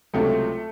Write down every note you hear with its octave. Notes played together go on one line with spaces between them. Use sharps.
C#2 C3 F#3 A3 C4 F4